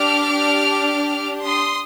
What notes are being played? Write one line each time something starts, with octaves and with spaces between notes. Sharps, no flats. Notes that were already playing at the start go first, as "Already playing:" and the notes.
Already playing: D4 G4 D6 F6
C6 D#6